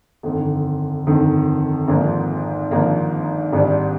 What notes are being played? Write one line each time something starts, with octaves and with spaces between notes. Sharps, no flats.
G1 F2 D#3
G1 F2 D#3
G#1 G#2 F3 A#3
G#1 G#2 F3 A#3
G#1 G#2 G3 D4